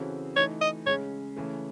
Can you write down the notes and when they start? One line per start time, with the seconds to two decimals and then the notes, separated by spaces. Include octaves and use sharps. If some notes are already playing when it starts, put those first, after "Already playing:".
Already playing: C#3 E3 C4 F#4 A4
0.36 E3 A3 D#4 C#5
0.61 D#5
0.86 C#3 G#3 C#4 C#5
1.36 C#3 E3 A3